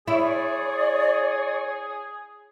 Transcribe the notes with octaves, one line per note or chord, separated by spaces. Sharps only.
E4 G#4 C#5 D5